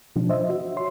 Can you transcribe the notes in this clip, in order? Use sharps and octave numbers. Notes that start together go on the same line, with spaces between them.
B2 F3 D4
C5 D#5 E5
F#4
C#5 E5 C6